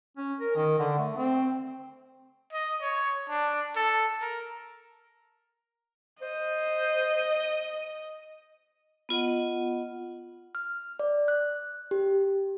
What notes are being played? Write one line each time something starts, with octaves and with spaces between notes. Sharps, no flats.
C#4
A#4
D#3
D3
A3
C4
D#5
C#5
D4
A4
A#4
C5 D#5
B3 F4 D#5 F#5
F6
D5
F#6
G4